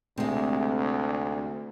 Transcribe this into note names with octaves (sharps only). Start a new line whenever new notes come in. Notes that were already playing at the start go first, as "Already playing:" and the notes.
D2 C3 G#3 A3 C4